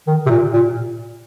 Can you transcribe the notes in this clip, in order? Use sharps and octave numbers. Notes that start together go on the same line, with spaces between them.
D#3
C3
A#2
A#2